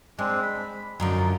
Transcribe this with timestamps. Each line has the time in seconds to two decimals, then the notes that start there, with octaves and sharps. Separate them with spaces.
0.19 G#3 C4 D4
0.43 B5
1.00 F#2 D3 F3 D#4